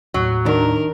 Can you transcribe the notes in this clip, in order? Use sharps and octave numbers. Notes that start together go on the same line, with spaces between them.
D#2 A2 F#3
D#3 D4 A#4